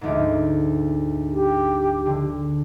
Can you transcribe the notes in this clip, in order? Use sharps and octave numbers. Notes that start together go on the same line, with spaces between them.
D2 G#2
G4
D3